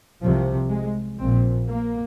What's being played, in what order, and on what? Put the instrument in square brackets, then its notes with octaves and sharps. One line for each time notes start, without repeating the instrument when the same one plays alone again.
[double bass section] C2 C3 F3
G#3
A#1 A#2 C4
A#3